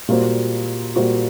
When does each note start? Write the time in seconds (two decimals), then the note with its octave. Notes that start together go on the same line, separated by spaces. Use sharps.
0.08 A#2 G3 A#3 F#4 C5
0.96 A#2 G3 A#3 F#4 C5